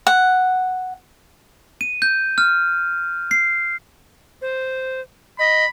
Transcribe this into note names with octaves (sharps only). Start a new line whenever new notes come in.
F#5
D#7
G6
F6
C7
C5
D#5 B5